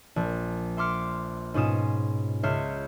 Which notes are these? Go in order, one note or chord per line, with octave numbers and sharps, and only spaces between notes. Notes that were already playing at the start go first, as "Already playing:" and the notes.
A#1
E5 C6 D6 F6 C#7
G#2 B2 C#4 F4 D#6 E7
C#2 C#5 E5 F6 G6 C7